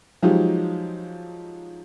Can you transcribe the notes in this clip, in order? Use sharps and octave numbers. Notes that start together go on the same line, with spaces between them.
F3 F#3 G#3 D#4 F4 G4